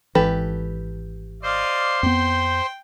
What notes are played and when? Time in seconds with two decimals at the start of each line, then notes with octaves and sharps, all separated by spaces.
0.15 G#1 E3 G4 A4 B4
1.43 C5 D5 D#5 F5 C6
2.03 F2 B3 G5